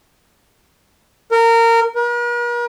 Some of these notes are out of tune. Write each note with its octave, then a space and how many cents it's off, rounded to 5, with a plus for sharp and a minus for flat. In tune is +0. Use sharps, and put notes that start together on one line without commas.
A#4 -20
A#4 +45